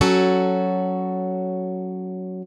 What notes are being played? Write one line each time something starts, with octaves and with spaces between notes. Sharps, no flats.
F#3 C#4 F#4 A4